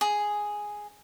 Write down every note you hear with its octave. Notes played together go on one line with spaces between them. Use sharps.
G#4